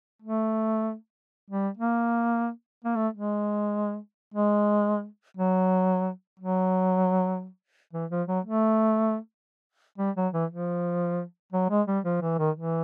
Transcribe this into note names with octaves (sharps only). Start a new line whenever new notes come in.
A3
G3
A#3
A#3
A3
G#3
G#3
F#3
F#3
E3
F3
F#3
A3
G3
F#3
E3
F3
F#3
G#3
G3
F3
E3
D#3
E3